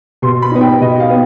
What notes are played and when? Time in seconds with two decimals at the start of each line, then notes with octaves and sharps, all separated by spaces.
0.22 B2 C6
0.42 B5
0.52 B3 D#4
0.61 G5
0.80 B2 D#5
1.00 F5
1.10 B3